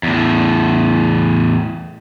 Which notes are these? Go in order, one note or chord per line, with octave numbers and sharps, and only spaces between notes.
E2 A2